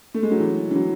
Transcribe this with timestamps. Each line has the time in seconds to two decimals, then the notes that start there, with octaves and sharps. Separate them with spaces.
0.14 A3
0.23 G#3
0.31 F#3
0.40 E3
0.71 E3
0.75 F#3